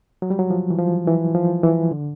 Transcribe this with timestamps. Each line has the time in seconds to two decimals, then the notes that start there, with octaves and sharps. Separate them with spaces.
0.22 F#3
0.30 G3
0.39 F#3
0.50 F3
0.70 E3
0.79 F3
1.07 E3
1.35 F3
1.63 E3
1.91 D3